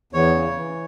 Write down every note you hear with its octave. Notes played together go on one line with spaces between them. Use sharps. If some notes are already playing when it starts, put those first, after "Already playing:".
E2 C#5
C#3
E3